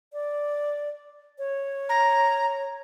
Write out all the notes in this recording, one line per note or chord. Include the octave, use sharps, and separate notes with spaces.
D5
C#5
A#5